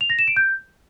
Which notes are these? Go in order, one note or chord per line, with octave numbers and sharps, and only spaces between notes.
F7
A#6
E7
D7
G6